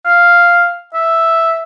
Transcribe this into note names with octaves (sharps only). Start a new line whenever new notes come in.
F5
E5